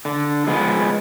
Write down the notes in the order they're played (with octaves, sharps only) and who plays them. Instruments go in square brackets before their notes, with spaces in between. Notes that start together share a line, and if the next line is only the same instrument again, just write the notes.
[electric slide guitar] D3
F3 G#3 B3